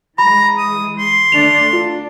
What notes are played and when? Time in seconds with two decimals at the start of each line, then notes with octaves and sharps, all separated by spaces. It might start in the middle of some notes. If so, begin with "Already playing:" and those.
0.18 E3 G#3 A#5 B5
0.58 D#6
0.99 C6
1.32 D3 A3 D4 F7
1.73 D4 F4